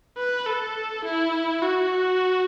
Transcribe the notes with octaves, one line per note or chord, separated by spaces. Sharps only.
B4
A4
E4
F#4